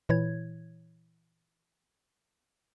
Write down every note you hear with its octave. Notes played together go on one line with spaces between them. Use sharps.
A#2 E3 E4 C#5 G#6